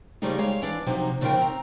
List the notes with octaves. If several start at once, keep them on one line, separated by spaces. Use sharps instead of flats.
C#3 F3 G3 A3 A#3 D#4
G3 G#3 C#5 F5
E3 D4 F5
C3 F3 F#3 D#4
F2 C#3 F3 D#4 A#4 G5
C4 A#5